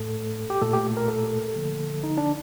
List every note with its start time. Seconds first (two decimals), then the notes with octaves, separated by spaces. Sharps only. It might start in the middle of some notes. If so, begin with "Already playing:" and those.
Already playing: A2 A3 A4
0.50 G4
0.61 A#2 A3 A4
0.73 G4
0.97 A#4
1.08 A4
1.56 D3 F3 A#3
2.03 D#4
2.18 D4